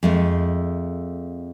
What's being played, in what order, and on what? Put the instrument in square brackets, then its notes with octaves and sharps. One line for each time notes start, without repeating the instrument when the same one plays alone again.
[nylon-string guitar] F2 G#3 A3